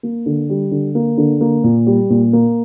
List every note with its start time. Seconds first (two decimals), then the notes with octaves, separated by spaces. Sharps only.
0.03 A#3
0.26 D3
0.50 G3
0.71 D3
0.95 A#3
1.18 D3
1.41 A#3
1.64 A#2
1.87 G3
2.10 A#2
2.33 A#3